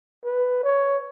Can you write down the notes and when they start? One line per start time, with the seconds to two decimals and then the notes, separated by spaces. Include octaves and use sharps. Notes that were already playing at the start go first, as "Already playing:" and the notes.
0.24 B4
0.63 C#5